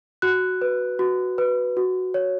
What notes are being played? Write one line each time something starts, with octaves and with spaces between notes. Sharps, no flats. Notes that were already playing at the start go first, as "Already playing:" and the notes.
F#4 F#6
B4
F#4
B4
F#4
C#5